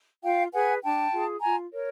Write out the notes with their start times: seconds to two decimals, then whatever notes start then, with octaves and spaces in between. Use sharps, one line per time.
0.23 F4 F5 G5
0.52 G#4 B4 F#5 G#5
0.83 D4 G5 A5
1.12 F4 G#4
1.42 F4 G#5 A#5
1.72 A#4 C#5